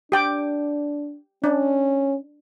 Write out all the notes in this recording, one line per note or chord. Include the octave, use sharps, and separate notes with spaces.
D4 G4 G5 D6
C#4 D4